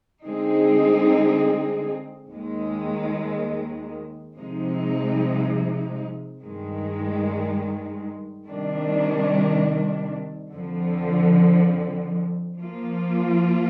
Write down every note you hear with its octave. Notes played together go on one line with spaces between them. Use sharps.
D3 G#3 C4 D#4 G#4
D#2 D#3 G#3
C3 F3 G#3 D#4
G2 D#3 G#3
C3 D#3 G3 D4
F2 D3 F3
F3 A#3 F4